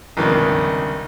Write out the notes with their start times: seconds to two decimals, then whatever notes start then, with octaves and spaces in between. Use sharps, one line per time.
0.17 C#2 G2 C3 D#3